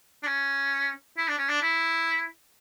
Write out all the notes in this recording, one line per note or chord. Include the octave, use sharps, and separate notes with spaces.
D4
C#4
E4
D4
C#4
D4
E4